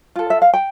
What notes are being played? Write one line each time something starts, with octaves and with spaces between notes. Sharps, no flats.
F4 A4
E5
F5
G5